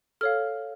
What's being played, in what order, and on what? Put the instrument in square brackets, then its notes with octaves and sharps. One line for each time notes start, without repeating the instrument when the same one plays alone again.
[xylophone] A4 C#5 F5 F6